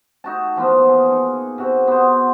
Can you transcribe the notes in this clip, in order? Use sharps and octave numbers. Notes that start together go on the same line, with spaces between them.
A3 D#4 F#4 A5
E3 F3 A#3 B3
G#4
D#4
C3 F#4
B3 C5